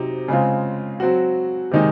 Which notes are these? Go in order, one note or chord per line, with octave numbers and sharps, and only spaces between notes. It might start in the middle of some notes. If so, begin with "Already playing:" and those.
Already playing: C3 F#3 C4 D#4
C#3 G#3 C4 F4
F#3 C4 F#4
C3 D#3 G#3 D#4